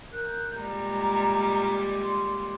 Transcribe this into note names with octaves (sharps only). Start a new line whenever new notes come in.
A#4 F#6 G6
A#2 G3 G#3 A#5
C6